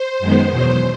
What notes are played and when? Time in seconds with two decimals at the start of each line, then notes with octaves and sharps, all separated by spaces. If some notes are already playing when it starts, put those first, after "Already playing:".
Already playing: C5
0.19 F#2 D#3 G#3 B3
0.50 E2 B2 F#3 C5